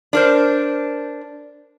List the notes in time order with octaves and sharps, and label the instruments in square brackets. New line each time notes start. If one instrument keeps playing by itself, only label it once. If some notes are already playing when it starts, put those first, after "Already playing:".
[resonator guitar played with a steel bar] D4 A#4 C5